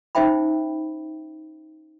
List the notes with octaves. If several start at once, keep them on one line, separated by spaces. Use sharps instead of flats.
C#4 D#4 C5 E5 G5 B5